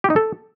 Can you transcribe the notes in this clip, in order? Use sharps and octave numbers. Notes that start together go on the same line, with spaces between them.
G4
D#4
A4